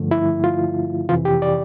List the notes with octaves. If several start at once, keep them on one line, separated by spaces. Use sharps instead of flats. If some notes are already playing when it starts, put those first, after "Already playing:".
Already playing: G2 D3 F3 A3
E4
F4
F2 C3 E3 F4
G4
D5